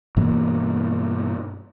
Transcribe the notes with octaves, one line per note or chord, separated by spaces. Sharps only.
G2 B2 E3 A#3